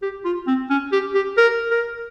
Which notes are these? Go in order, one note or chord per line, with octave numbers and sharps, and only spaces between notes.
G4
F4
C4
C#4
G4
G4
A#4
A#4